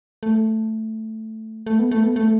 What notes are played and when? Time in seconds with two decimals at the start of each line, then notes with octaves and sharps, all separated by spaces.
0.23 A3
1.67 A3
1.79 B3
1.91 A3
2.04 B3
2.16 A3